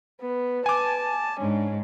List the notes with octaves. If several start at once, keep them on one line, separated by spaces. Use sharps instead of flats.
B3 B4
G#5 A5 D6
G#2 C#4 D4